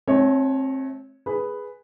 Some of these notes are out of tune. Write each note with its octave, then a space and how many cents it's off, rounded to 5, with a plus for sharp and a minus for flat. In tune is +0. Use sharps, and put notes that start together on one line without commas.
A3 -25 C4 +30 C#5 +0
G#4 +0 B4 +0